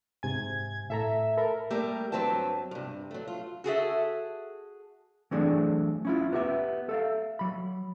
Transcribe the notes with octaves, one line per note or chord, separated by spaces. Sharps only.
G#2 C3 G#5 G#6
A2 A4 E5 A#5
A4 A#4 B5
G3 A3 A#3 G4 A#4 E5
G2 F#3 C4 B4 G5 A5
G2 C3
F#3 A3
F4
F#4 G#4 A4 E5
E3 F#3 A3 C4 D4 G#4
C#4 E4 F4
B3 G4 E5
A4 E5 F5
F#3 B5